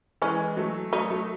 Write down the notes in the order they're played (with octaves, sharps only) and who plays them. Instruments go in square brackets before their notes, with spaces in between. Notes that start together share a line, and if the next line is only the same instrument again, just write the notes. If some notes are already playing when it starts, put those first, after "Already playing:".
[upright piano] E3 G#3 [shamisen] C#4
[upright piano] F#3 A3
[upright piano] F#3 A3 [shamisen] D#4
[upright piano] F#3 A3